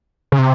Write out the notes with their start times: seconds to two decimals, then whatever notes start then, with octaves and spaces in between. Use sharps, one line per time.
0.32 C#3
0.39 C3